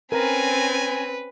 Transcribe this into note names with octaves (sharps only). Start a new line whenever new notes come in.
C4 C#4 A#4 B4 G#5 A#5